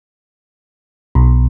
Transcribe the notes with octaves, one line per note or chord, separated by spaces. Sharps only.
B1